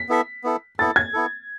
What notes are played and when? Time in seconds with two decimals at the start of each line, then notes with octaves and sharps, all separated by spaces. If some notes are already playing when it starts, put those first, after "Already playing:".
Already playing: B6
0.09 B3 E4 A4 E5
0.44 B3 E4 A4
0.79 B3 E4 A4 A6
0.96 G#6
1.13 B3 E4 A4